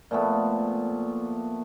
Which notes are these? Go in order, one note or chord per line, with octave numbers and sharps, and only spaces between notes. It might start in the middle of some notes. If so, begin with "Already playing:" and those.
A#2 F3 A3 B3